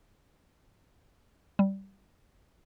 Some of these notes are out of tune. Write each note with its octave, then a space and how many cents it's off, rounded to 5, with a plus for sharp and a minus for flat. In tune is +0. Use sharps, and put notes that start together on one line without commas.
G3 -10